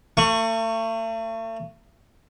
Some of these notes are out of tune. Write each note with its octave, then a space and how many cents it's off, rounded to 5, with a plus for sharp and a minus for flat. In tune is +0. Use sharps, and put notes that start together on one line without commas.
A3 +40 C#6 +0